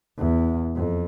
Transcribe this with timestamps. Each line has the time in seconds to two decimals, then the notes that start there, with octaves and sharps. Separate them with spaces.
0.18 E2
0.76 F2